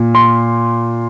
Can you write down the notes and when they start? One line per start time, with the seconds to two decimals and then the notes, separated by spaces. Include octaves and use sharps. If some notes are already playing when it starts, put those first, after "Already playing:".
Already playing: A#2
0.15 C6